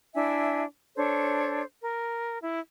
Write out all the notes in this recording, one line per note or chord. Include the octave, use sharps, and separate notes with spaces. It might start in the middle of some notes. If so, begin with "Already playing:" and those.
D4 E4 E5 G#5
D4 A4 C5 C#5
A#4
E4